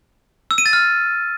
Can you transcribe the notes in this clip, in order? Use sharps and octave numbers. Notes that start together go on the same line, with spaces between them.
E6
D#7
A6
F6